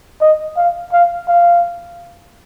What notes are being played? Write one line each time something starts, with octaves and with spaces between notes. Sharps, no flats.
D#5
F5
F5
F5